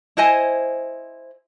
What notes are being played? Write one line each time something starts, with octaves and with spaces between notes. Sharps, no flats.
E4 C5 D#5 G#5